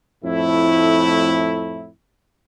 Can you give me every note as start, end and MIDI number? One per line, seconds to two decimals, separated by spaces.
0.24 1.87 41
0.24 1.87 45
0.24 1.87 57
0.24 1.87 64